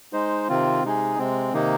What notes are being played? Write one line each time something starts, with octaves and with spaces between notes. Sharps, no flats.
G#3 D#4 C5
C3 D#3 C4 F4
C3 G#3 D#4 G#4
C3 G#3 C4
C3 D#3 A#3 D#4